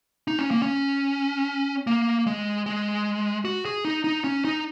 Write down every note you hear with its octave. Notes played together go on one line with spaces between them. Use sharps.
D#4
C#4
A#3
C#4
A#3
G#3
G#3
F#4
G#4
D#4
D#4
C#4
D#4